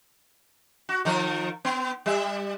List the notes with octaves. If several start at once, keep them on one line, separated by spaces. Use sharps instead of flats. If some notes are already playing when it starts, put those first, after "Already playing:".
F#4
D#3 F3 A#4
B3
G3 E5